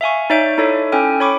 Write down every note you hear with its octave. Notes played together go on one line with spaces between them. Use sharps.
E5 F5 G#5 C#6
D#4 C#5 D5 E5 G6 D7
D#4 E4 A4 C#5 D5 E5
C#4 E4 A4 G5 G#5 F6
C#5 B5 C#6 D6